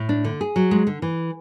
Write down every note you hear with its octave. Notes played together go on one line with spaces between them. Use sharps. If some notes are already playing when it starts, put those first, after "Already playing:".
Already playing: A2
D4
D3
G#4
F#3
G#3
D3
E3